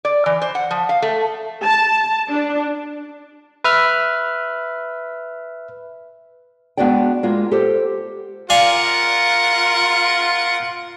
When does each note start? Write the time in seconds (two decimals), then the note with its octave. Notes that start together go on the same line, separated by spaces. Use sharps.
0.05 D5
0.26 E3
0.42 C5
0.55 F#5
0.71 F3
0.89 F5
1.02 A3
1.64 A5
2.31 D4
3.64 B4 E5 F6
6.77 G#3 B3 D4 F#4 D5 G5
7.23 G#3 A#3 F4
7.52 G4 A4 C5
8.50 F4 A#4 D5 F5 F#5 G#5